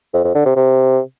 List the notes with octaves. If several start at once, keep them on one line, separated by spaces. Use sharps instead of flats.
F2
F2
D3
C3
C3